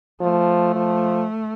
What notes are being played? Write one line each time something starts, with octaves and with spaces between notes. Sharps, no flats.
F3 A3
F3